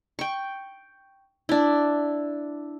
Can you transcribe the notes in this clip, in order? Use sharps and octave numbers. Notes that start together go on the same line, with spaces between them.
G5 C#6
D4 E4